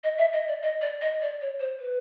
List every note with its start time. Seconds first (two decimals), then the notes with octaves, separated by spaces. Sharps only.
0.04 D#5
0.18 E5
0.33 D#5
0.48 D5
0.62 D#5
0.81 D5
1.01 D#5
1.22 D5
1.41 C#5
1.60 C5
1.80 B4